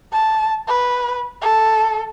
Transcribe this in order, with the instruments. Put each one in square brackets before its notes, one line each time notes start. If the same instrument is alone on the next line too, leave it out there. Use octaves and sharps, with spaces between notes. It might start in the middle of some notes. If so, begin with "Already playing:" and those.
[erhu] A5
B4
A4